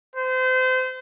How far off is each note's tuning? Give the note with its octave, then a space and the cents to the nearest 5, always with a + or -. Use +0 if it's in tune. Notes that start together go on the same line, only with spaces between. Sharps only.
C5 -30